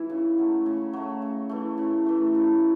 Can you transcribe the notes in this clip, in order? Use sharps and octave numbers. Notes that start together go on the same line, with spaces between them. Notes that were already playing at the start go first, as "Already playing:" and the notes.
Already playing: G#2 E3 E4
C#3
F#3 A3
C#3
F#3 A3
C#3
E3 A3
C#3
E3 A3
C#3